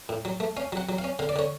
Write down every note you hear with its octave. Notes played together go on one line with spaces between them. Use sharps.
A2
F#3
A3
C#4 F5
F#3 F#5
F#3
F5
C#4
D3 F5
D5
D3 C#5